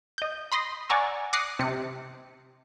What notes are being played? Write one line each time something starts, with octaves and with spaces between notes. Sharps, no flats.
D#5 G6
B5 C6 D#6 A#6
D5 F#5 G#5 A#5 C#6 E6
D6 D#6 F#6 A#6 C7 C#7
C3 C#7